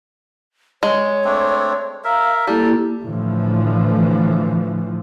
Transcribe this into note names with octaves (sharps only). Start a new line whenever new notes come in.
G#3 C#5
A3 C4 D4
A#4 E5 F5
G3 A#3 E4 G4 A4 A5
A2 D3 E3 F3